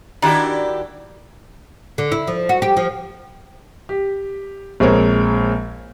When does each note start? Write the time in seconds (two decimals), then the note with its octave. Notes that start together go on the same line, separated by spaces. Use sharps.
0.22 D#3 D4 E4 F#4 G4
1.98 D3
2.12 E4
2.27 F3
2.49 F#4
2.62 G4
2.77 F3
3.89 G4
4.80 A#1 G#3 C4 A#4 C#5